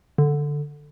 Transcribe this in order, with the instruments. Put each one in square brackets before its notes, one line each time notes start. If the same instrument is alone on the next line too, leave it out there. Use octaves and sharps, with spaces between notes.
[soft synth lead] D3